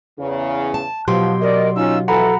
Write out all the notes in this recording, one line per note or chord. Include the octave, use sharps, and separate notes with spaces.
E2 C#3
A5
B2 F3 F#3 G4 C6
A#4 D5 D#5
C#4 D#4 F4 E6
E3 F3 A4 F#5 A#5 B5